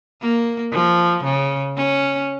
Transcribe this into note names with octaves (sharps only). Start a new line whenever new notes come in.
A#3
F3
C#3
C#4